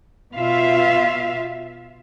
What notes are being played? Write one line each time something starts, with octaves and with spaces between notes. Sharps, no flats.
B2 F4 E5 F5